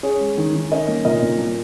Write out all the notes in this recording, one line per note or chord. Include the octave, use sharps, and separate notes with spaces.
C#4 G#4 C#5
G#3
D#3
D#3
C#4 A#4 D#5
A#3
A#2 A#4 D#5
A#2
A#3